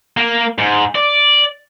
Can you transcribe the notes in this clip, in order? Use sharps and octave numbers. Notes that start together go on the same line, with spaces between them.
A#3
G#2
D5